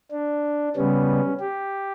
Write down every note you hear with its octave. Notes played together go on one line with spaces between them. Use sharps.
D4
C#3 G3 B3 C#4
G4